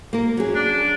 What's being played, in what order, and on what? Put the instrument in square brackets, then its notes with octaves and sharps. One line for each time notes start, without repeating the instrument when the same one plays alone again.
[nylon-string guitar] A#3 A#4
F#3 C#4 G#4
[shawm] D4